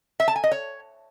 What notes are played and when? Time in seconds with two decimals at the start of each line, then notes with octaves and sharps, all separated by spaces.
0.20 E5
0.28 A5
0.36 G#5
0.44 D#5
0.51 C#5